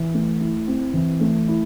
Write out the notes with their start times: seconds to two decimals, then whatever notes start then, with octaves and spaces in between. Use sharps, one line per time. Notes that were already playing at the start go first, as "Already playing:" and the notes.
Already playing: E3
0.14 A3
0.41 E4
0.68 C4
0.94 E3
1.21 A3
1.48 E4